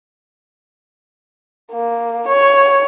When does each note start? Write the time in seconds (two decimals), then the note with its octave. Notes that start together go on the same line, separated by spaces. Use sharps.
1.72 A#3
2.27 C#5